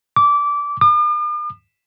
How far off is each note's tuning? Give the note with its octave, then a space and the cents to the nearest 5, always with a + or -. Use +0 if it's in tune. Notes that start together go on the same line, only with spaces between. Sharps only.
D6 -20
D6 +45